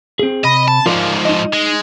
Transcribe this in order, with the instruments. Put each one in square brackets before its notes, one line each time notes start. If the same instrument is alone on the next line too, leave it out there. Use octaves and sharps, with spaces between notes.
[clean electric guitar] C4 G#4
[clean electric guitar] C3 B5 [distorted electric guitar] D#5
[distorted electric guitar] A5
[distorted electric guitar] G#2 F3 [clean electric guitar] F4 A#4 D5
[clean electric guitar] D#4 D#5
[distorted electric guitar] G#3